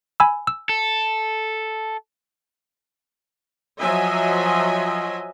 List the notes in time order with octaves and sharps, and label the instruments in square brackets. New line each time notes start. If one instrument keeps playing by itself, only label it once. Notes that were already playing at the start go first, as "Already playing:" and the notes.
[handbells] G#5 B5 E6
E6
[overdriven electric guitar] A4
[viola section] F3 F#3 D#5 E5 G#5